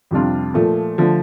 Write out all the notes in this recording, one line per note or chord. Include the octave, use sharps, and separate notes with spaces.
F2 C3 G3 D4 F4
A#2 F3 A3
D3 F3 A3